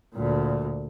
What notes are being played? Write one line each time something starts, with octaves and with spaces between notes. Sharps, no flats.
D2 A#2